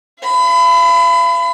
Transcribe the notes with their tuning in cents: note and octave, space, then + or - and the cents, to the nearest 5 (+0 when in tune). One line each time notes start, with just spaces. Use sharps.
F5 -45 B5 +30